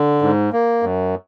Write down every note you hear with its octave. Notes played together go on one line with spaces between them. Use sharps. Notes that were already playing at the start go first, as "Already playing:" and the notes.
Already playing: D3
G#2
A#3
F#2